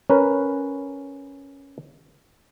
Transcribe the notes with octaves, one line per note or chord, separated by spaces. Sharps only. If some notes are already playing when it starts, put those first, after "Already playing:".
C#4 A#4 B4